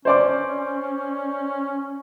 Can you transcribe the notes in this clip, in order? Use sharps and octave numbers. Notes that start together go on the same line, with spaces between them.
C#4 C5 D5 D6